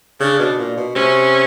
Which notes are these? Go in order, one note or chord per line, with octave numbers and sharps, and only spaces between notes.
C#3 D4
B2
A#2
B2
C3 C#4